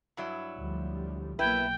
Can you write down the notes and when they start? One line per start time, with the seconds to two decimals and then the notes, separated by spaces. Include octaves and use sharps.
0.17 G2 F#3 E4
0.59 D2 F3 G3
1.39 B1 A#3 E4 B4 G5